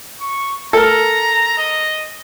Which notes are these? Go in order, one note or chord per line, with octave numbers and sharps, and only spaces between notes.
C#6
A4 A#4 A#5
D#5